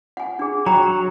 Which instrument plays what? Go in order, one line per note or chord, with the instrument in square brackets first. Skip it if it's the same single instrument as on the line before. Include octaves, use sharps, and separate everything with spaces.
[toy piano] F#5 G#5
D4 G#4
[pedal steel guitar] F#3 [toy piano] G5 A#5